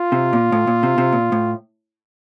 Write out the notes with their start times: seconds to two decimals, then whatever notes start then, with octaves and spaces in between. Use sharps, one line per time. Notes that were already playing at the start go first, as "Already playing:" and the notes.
Already playing: F4
0.12 C3
0.33 A#2
0.52 A2
0.67 A#2
0.83 C3
0.98 C3
1.13 A#2
1.32 A2